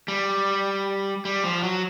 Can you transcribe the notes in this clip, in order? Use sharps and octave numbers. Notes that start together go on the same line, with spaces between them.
G3
G3
F3
F#3